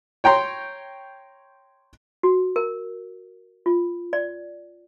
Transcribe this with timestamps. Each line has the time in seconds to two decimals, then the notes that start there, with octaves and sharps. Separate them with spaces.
0.24 C#5 G5 A#5 C6
2.23 F#4
2.56 A#4
3.66 F4
4.13 D5